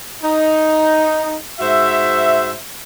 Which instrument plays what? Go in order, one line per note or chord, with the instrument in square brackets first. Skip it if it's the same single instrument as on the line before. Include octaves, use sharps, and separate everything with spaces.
[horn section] D#4
G#2 F#4 C5 E5